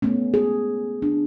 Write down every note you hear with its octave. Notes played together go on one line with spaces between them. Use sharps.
A3 B3 C#4
G#4
D4